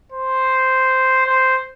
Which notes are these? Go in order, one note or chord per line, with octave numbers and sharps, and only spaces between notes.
C5
C5